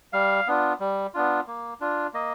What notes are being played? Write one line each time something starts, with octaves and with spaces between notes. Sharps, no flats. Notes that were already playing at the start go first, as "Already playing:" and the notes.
G3 F5
B3 D4 F4
G3
B3 D4 F4
A#3
D4 F4
A#3 D#5